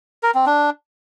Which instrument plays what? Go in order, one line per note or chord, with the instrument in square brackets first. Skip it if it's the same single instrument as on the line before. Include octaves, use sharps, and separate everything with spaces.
[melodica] A#4
C4
D4